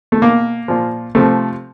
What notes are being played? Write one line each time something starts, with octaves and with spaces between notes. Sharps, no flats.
A3
B2 A#3
A#2 F3
C3 F3 A3